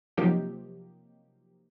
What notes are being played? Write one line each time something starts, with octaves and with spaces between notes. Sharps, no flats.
C3 F3 F#3 A#3 D#4 G4